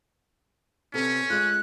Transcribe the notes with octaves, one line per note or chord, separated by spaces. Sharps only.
C3 B3 C#4 A4
G#3 F4 F#6